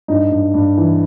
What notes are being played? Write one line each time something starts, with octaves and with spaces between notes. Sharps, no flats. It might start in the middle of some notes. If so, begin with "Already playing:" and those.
G2 D#4
G2
G2
E3